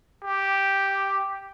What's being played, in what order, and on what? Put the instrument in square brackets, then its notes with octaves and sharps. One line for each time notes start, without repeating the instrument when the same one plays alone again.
[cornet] G4